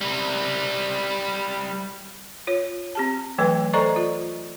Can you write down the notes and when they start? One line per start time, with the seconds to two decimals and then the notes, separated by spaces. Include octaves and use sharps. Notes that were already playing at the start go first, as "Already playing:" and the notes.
0.01 G3 E4
2.47 F4 C#5
2.95 C4 G4 A5
3.38 E3 F#3 A3 B4 G5
3.73 A4 C5 D5 D#5 A#5 C#6
3.96 F4